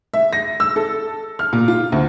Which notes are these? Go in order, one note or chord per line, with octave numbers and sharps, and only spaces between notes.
E5
A#6
E6
A4
F6
A#2
F4
D2